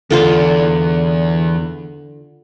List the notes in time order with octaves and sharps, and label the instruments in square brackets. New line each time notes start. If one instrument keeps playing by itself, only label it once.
[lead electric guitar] E2 [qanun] D3 F4 C5